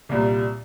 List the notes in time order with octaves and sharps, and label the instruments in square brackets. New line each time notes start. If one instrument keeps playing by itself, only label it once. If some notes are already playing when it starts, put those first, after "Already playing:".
[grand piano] C2 A#2 G3